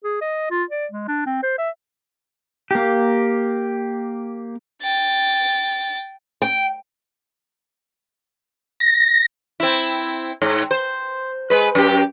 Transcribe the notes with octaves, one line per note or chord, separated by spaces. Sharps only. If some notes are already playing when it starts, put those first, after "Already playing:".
G#4
D#5
F4
D5
G#3
D4
C4
C5
E5
A#3 G4
G5 A6
G5
A#6
C4 E4
G#2
C5
G#3 B4
F#2 G4